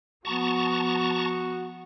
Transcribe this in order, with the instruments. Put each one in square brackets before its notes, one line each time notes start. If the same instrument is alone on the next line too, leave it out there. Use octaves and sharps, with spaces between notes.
[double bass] F3 B3 [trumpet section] F#4 [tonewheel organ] A5 A#5 C#6